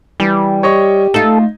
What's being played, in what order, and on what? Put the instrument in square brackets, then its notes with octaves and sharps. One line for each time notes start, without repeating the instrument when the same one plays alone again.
[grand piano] E3 [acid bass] G3
[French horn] G4 [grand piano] C#5 D#5 C#6
[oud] A3 F4 [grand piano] D#4 [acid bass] A4